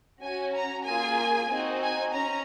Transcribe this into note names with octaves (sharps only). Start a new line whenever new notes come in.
C#4 F#4 G#5
A#5
A#3 F4 G#4 G#5
C4 D#4 F#4
G#5
C#4 A#5